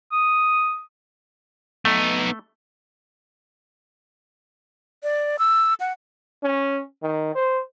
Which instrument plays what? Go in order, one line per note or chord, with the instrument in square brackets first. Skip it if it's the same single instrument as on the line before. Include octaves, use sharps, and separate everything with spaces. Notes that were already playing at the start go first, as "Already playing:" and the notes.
[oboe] D#6
[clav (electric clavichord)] A3 [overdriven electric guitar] B3 D#4
[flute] D5
E6
F#5
[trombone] C#4
D#3
C5